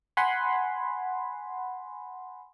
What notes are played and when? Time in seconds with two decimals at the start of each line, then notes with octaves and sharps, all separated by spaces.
0.17 F#5 G#5 B5 C6